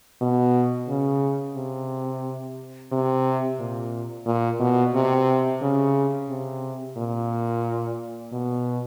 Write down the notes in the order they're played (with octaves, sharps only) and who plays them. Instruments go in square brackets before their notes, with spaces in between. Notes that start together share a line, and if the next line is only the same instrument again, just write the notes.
[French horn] B2
C#3
C3
C3
A#2
A#2
B2
C3
C#3
C3
A#2
B2